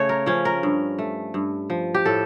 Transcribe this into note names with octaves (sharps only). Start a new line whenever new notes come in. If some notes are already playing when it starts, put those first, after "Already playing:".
Already playing: C#3 A3 C#5
A#4
F3 C#4
A#4
G2
A3
G2
F3
G4
A2 A4